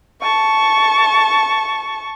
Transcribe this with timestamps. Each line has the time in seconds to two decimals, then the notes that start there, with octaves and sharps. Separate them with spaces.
0.22 A5 C#6